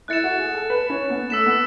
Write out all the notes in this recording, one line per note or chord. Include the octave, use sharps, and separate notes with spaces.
E4 F#6 A6 C#7 E7
F#4
G#4
A4
B4
C#4
B3
A3 E6 B6 E7
B3